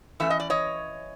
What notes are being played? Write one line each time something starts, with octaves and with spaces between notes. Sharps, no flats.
E3 A3 C#4 E5
D#5
D5
C#5 D#5